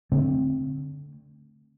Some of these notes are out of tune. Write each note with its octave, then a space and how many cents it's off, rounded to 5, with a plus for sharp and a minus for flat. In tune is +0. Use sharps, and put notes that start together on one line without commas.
D3 -20 A3 +0 C4 +10